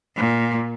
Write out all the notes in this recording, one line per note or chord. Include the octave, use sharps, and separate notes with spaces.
A#2